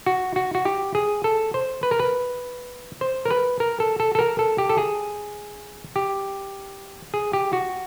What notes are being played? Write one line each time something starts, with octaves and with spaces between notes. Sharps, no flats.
F#4
F#4
F#4
G4
G#4
A4
C5
B4
A#4
B4
C5
A#4
B4
A#4
A4
A4
A4
A#4
A4
G4
A4
G#4
G4
G#4
G4
F#4